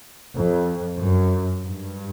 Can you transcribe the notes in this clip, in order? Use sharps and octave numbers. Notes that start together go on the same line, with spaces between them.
F2
F#2
G2